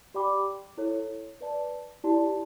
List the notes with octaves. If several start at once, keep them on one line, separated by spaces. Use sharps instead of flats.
G4 D5 G5 B5 D6
E4 A4 C#5
B4 D5 A5
E4 G4 D5 A5